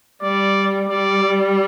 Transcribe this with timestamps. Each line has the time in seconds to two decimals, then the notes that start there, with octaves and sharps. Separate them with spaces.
0.22 G3 D5
0.89 G3 D5